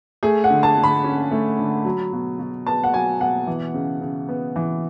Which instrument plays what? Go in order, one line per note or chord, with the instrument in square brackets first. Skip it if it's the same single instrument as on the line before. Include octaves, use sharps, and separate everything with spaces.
[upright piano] A3 G#4
F#5
D3
A5
D3
B5
C#4
A3
D3
F#3
B2
B2
B3 A5
F#5
F#3 G#5
B2 F#5
E3
C#3
C#3
B3
E3